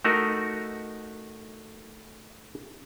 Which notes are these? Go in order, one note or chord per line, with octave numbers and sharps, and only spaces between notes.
A3 D#4 F#4 A#4